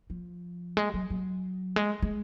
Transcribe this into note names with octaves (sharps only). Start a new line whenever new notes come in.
F3
G#3
F#3
F#3
G#3
G#3